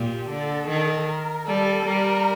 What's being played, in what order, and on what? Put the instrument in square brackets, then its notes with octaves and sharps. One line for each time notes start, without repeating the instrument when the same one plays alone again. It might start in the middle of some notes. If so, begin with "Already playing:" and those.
Already playing: [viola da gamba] A#2 [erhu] G4
[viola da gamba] D3 [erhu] A4
[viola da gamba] D#3
[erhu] A#4
[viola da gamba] G3 [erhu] A4
[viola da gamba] G3 [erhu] A#4